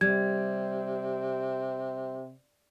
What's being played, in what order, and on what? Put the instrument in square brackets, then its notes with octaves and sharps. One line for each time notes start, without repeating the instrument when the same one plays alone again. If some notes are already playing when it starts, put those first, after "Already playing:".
[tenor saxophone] C3 [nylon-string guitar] G3 [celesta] G#6